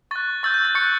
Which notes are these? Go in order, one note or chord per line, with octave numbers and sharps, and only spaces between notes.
C#6 F#6 A6
C#6 E6 G6 A6
G6
A6
C#6 F#6 A6 C#7